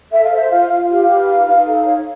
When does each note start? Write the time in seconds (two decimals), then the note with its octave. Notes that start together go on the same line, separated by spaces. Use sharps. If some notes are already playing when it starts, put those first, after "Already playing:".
0.12 A4 E5
0.23 F5
0.32 C5 E5
0.50 F4 F5
0.70 F4
0.89 G4 F5
1.08 B4
1.27 D#4
1.47 D#4
1.67 A4
1.85 C#5